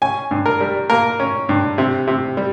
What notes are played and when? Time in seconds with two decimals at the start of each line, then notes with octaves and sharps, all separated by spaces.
0.02 C#4 G#5
0.31 G2
0.46 A#4
0.61 G3
0.90 A#3 A#4
1.20 C#4
1.49 G2
1.78 C3
2.07 C3
2.37 G3